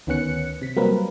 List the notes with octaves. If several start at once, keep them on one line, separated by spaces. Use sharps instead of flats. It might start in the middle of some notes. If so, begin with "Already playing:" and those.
D2 D#3 B3 C#4 F#6 C#7
C3 B6
F#3 G3 A#3 C4 A#4 B4